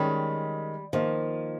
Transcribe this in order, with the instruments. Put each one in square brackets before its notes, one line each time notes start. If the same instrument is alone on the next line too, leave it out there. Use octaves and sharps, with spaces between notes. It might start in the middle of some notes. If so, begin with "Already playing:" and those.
Already playing: [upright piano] D#3 G#3 C#4 [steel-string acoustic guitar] G3
[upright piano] D#3 A#3 D#4 [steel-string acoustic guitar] F3